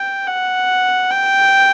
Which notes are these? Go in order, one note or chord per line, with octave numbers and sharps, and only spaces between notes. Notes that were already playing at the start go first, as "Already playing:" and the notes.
Already playing: G5
F#5
G5